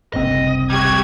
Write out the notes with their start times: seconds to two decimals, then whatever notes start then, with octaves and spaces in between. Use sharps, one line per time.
0.13 F#1 C2 C4 D#5
0.70 G3 F#4 G4 G#6